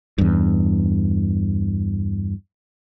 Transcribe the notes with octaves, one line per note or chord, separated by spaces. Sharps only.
E2 G2